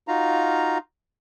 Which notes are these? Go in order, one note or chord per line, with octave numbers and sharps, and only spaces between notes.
D#4 F4 F#4 F5 A#5